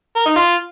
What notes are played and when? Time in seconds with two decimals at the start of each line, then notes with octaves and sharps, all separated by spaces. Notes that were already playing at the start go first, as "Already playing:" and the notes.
0.16 A#4
0.26 D#4
0.36 F4